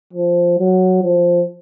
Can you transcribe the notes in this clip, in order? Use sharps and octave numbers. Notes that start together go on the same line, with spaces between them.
F3
F#3
F3